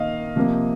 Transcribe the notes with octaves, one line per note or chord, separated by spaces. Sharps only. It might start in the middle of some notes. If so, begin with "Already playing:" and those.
Already playing: D#3 A#3 D#5 F5
C3 F3 A#3